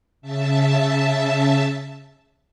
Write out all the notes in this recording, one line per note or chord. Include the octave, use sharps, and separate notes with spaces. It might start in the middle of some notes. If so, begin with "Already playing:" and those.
C#3 E5 A5